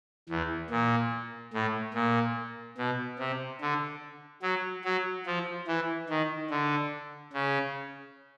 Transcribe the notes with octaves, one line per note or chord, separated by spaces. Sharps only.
E2
A#2
A2
A#2
B2
C3
D3
F#3
F#3
F3
E3
D#3
D3
C#3